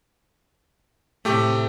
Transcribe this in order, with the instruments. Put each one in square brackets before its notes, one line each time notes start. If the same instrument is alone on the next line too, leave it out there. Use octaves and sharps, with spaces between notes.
[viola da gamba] A2 C3 [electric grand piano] A3 G4